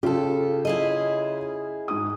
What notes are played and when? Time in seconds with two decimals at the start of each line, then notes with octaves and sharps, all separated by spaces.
0.03 C#3 F4 G4 A4
0.65 E4 G#4 D#5
1.88 G#2 D#6